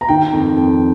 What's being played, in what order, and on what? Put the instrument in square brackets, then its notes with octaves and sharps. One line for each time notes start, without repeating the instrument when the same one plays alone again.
[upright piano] A#5
D#3 G5
F2
F2